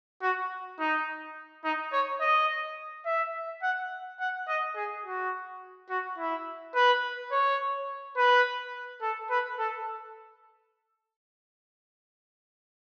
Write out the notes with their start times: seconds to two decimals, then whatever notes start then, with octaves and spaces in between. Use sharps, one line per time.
0.22 F#4
0.79 D#4
1.64 D#4
1.92 C#5
2.21 D#5
3.06 E5
3.63 F#5
4.20 F#5
4.47 D#5
4.76 G#4
5.05 F#4
5.90 F#4
6.18 E4
6.75 B4
7.31 C#5
8.17 B4
9.02 A4
9.30 B4
9.59 A4